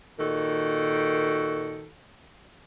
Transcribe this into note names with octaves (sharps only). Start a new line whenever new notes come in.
A#2 D#3 F#4 A4